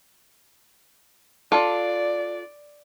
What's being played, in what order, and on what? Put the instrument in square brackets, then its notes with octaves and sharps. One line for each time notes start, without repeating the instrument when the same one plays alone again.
[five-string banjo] D4 F4 A4 [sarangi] D5